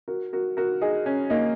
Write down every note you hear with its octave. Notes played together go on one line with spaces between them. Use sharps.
F#4 A#4
F#4 A#4
F#4 A#4
D#4 G#4
C#4
A#3 D#4